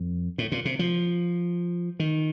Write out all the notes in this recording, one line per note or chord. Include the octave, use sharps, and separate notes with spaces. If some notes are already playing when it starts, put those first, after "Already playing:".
Already playing: F2
A2
A#2
C3
F3
D#3